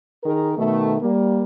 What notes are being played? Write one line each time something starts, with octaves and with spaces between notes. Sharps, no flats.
D#3 G#4 A#4
B2 D#3 A3
G3 A#3